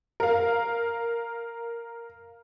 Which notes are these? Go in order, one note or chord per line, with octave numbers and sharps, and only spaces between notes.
A#4 F5